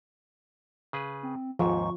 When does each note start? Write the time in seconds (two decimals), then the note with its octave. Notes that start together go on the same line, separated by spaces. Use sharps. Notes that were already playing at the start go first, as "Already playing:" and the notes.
0.93 C#3 G#4 B4
1.23 C4
1.59 D#2 G#2 F3 C#6